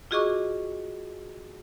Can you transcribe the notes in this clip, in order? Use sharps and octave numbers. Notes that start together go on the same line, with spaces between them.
F4 F#4 G#4 D#5 C#6 D6